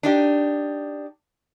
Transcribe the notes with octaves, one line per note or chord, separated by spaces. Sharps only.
D4 D#4 G4